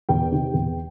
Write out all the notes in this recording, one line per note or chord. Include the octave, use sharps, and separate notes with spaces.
E2 G5
C3 D#3
E2